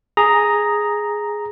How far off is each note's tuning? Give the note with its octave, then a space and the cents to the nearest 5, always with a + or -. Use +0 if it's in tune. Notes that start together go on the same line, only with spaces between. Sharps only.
G#4 +0 A#5 +0